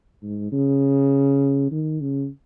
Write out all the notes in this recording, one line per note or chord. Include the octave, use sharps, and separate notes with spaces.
G#2
C#3
D#3
C#3